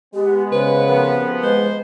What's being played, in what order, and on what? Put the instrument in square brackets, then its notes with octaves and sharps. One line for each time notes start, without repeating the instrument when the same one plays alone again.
[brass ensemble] G#3 B3 [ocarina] G4
[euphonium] C#3 [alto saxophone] B4 [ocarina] C5
[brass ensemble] C3 F3 B3 [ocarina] A#4
[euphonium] G#3 [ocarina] B4 [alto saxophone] C5